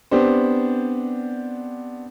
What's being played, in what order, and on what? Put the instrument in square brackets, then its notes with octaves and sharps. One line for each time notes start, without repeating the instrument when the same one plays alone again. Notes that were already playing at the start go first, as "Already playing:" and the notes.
[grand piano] B3 C4 D4 G4 C5